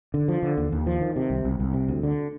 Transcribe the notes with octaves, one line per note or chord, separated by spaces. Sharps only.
D3
F3
D3
D#2
D#2
F3
D#3
C3
C2
C2
C2
C3
D2
D3